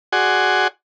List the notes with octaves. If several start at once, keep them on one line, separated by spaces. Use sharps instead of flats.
F#4 G#4 D5 F#5 G#5 C6